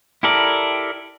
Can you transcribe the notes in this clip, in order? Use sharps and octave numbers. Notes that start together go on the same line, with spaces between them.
E4 G4 A4 A#4 D5